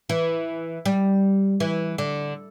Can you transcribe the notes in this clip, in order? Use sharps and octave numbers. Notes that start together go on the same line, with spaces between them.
E3
G3
E3
D3